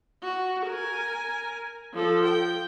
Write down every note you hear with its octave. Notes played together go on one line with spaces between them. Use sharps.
F#4
A#4 G#5
F3 A4
G5